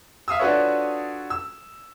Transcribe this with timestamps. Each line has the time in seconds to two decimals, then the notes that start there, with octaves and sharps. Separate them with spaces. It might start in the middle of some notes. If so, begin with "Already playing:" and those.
0.28 E5 F5 D#6 E6
0.39 D4 F4 F#4 A4 B4 C#5
1.30 E6